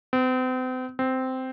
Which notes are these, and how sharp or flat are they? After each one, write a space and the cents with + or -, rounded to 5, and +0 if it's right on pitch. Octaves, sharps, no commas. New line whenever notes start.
C4 -40
C4 -10